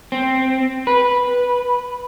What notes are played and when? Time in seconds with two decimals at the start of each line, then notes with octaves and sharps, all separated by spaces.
0.12 C4
0.87 B4